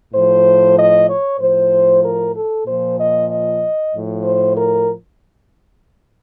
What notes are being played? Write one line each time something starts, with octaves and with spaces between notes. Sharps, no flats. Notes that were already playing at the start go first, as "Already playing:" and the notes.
A2 F3 C5
D#5
C#5
A2 F3 C5
A#4
A4
A#2 F3 C5
D#5
D#5
A2 F3
C5
A#4